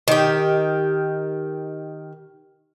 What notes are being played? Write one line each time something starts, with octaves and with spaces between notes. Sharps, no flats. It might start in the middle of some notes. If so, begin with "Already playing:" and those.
D#3 G4